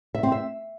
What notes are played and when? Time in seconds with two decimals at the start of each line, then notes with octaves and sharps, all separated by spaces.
0.15 E5
0.23 C4
0.32 E5